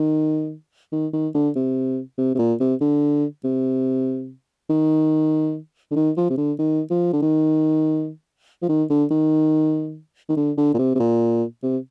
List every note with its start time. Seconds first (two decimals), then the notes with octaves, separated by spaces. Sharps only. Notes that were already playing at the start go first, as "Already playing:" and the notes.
Already playing: D#3
0.92 D#3
1.13 D#3
1.35 D3
1.55 C3
2.18 C3
2.35 C3
2.39 A#2
2.60 C3
2.81 D3
3.44 C3
4.70 D#3
5.91 D3
5.96 D#3
6.17 F3
6.30 C3
6.38 D3
6.59 D#3
6.90 F3
7.13 D3
7.22 D#3
8.62 F3
8.69 D#3
8.90 D3
9.10 D#3
10.29 D#3
10.37 D3
10.57 D3
10.74 A#2
10.79 C3
10.95 C3
11.00 A#2
11.63 C3